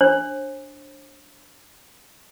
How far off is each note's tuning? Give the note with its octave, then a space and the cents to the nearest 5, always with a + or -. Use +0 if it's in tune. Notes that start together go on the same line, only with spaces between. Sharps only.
D4 -10 C5 +40